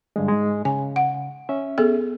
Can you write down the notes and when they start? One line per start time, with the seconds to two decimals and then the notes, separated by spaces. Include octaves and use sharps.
0.16 G2 D3 G#3
0.28 G#2 G#3
0.65 C#3 G#5
0.96 F#5
1.49 C#4 E5
1.78 B3 G#4 A4